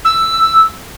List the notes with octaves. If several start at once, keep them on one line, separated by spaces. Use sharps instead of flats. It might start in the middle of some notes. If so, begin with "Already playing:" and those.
E6